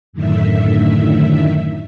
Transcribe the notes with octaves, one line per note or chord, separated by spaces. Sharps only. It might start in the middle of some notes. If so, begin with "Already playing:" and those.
F#2 A2 D3 D#3 E5